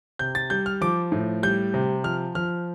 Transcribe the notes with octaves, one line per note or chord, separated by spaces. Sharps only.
C3 G6
A6
G3 G6
F6
F3 D6
A2
G3 G6
C3
F3 F6
F3 F6